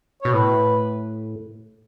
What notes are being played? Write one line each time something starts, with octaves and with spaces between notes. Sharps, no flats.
B2 C#5
A2 B4